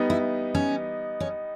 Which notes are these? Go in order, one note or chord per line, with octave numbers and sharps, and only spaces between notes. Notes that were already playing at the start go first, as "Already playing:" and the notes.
Already playing: G3 B3 D#4
E4
C#4
C#4